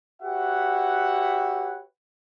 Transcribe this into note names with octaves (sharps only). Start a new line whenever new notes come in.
F#4 G4 B4 C#5 E5 F#5